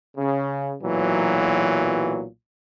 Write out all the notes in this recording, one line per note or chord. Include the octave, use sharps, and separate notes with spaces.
C#3
B1 A#2 E3 F#3